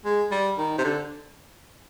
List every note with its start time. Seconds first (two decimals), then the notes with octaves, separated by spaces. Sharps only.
0.05 G#3
0.31 G3
0.58 D#3
0.78 C3
0.84 D3